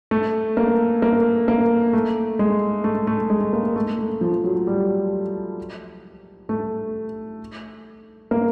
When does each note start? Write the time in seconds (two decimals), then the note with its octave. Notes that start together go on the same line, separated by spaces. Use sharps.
0.11 A3
0.57 A#3
1.02 A#3
1.48 A#3
1.93 A3
2.39 G#3
2.84 A3
3.07 A3
3.30 G#3
3.53 A#3
3.76 A3
3.99 A3
4.21 F3
4.44 F#3
4.67 G3
6.49 A3
8.31 A#3